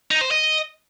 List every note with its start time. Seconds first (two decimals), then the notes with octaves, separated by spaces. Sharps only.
0.11 D#4
0.21 C5
0.31 D#5